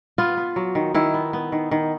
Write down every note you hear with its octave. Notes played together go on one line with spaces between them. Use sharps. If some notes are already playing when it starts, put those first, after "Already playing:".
B3 F4
B3
F#3
D#3
D#3 E4
B3
B3
D#3
D#3